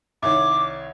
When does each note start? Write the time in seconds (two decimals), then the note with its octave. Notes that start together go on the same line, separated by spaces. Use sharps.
0.23 C2 D#3 C#5 D6